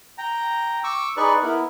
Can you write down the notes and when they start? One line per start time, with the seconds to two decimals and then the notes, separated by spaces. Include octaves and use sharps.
0.18 G5 A#5
0.84 C#6 D6 E6
1.17 D#4 G#4 B4 D5 C#6
1.43 B3 E4 A#4